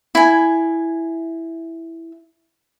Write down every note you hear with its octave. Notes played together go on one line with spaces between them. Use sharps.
E4 G#5